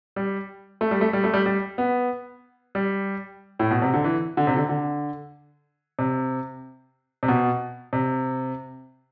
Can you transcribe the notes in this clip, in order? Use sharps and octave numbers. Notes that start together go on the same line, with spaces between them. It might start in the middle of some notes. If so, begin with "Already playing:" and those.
G3
A3
G3
A3
G3
A3
G3
G3
B3
G3
A2
B2
C3
D3
E3
D3
C3
D3
D3
C3
C3
B2
C3